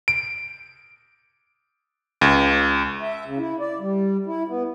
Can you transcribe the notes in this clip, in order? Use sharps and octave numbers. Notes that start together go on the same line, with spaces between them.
D7
C#2
E5
C#3
E4
D5
G3
E4
B3